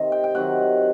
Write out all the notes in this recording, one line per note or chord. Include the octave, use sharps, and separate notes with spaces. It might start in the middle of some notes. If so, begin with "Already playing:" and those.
Already playing: C3 D#3 D#5
G5
G5
C3 D#3 F#3 F#5